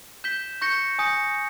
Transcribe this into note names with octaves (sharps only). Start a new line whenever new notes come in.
G6 B6 E7 G7
C#6 G6 A#6 C#7 G7
G#5 D#6 G6 A#6 C#7